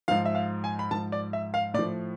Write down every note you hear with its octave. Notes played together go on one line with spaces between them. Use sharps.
G#2 F3 F5
E5
F5
G#5
B5
G#2 F3 A5
D5
E5
F5
A2 F3 D5